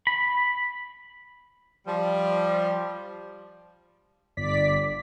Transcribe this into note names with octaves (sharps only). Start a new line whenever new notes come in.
B5
F3 G3
G1 D5 B6